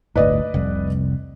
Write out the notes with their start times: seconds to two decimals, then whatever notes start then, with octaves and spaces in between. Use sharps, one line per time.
0.16 D1 G1 D2 B4 D5 D#5
0.54 F1 C2